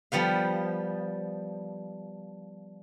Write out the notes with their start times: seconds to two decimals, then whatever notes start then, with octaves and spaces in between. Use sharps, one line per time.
0.12 F3 G3 B3 F5